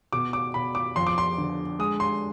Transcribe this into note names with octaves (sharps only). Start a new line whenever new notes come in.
B2 D6
D6
B2 B5
D6
F2 C6
D6
C6
D3
G#3 D#6
C6